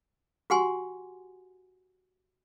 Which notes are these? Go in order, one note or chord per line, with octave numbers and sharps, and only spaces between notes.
F#4 G4 F#5 G#5 C6